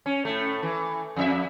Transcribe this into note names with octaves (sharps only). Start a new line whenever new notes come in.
C#4
A2 A3
E3
F2 F4 E5